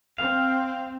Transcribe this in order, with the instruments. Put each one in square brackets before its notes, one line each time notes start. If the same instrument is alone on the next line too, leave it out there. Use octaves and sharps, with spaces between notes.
[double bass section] C4 [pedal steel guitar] F5